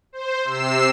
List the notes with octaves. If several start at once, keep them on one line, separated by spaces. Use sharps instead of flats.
C5
C3 E6 C7 E7